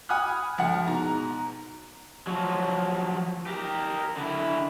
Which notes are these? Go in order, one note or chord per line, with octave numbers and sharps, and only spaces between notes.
F#5 G#5 B5 D#6 F6 F#6
G1 F3 F#4 F#5
G#2 B2 A#5
F3 F#3
G4 A#4
D3 E4